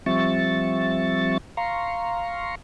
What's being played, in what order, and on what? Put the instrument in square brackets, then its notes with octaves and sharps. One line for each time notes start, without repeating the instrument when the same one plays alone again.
[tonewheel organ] F3 G3 C4 E5 C#6 A6
F5 A#5 C6 C#6